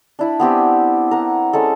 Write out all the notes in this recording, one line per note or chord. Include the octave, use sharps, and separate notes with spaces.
D4 E4 B5
B3 C4 G4 G#5
A#4 F#5
G#3 C#4 A4